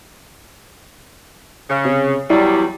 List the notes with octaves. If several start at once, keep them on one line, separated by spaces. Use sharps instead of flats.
C#3
C3
E2 F#3 G3 E4